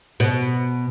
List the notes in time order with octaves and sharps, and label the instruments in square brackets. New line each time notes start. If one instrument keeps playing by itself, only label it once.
[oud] B2